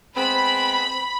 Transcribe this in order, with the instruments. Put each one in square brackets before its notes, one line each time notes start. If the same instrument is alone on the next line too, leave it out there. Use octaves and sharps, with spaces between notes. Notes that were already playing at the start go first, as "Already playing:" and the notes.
[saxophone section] G#3 B3 C4 [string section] B5